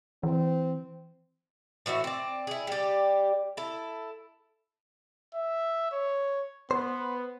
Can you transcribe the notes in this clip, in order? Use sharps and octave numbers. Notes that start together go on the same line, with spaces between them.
E3 C4
A2 E3 F#4 E5
C4 D5
E4 G#4
G3 G4
E4 A4
E5
C#5
B3 C5